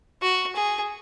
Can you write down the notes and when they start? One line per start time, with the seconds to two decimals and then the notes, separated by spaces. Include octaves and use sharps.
0.22 F#4
0.56 G#4